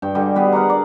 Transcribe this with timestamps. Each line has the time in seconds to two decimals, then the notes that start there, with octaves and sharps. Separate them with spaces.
0.02 G2 G5
0.15 D3 G3 D#5 G#5
0.35 G3 B3 G4 G#4
0.52 A#4 D5 F#5 A#5
0.70 D5